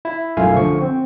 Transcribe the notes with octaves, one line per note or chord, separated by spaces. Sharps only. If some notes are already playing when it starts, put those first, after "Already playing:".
E4
B1 F#2 A3 F4 F5 G#5
D3 F3 C#6
C4